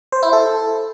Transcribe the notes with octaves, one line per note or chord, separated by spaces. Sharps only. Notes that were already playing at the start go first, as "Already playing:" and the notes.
C5
E4
A4